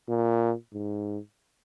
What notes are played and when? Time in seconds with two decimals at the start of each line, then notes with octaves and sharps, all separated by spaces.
0.08 A#2
0.73 G#2